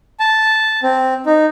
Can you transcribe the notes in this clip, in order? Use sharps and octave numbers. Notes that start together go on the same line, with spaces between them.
A5
C4
D#4